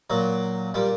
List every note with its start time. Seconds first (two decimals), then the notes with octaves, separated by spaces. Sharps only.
0.10 A#2 F#3
0.74 A#2 G3